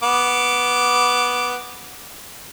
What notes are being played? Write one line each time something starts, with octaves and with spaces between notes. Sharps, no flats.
B3 D6